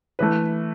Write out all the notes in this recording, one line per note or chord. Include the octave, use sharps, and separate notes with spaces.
E3 A3 B4